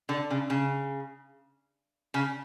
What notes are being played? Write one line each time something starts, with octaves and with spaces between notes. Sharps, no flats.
D3
C#3
C#3
C#3